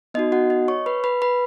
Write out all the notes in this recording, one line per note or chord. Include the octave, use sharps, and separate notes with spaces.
B3 D#4 F#4 D#5
F#4 F#5
D#5
C#5 C#6
B4 B5
B4 B5
B4 B5